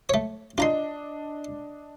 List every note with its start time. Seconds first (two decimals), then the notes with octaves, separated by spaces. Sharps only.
0.09 A3 C#5
0.58 D4 F4 D#5 A#5 C6